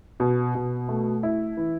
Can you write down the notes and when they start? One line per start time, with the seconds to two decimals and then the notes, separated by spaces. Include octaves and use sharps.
0.20 B2
0.55 B2
0.89 A3
1.23 E4
1.57 E3